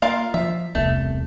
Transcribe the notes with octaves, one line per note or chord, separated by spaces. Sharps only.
A#3 F4 A#4 F5
F3 E5
E1 C2 A3 B3